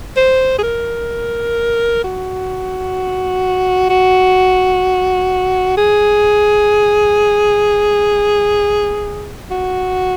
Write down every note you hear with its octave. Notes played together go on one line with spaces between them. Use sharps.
C5
G#4
A#4
F#4
F#4
G#4
F#4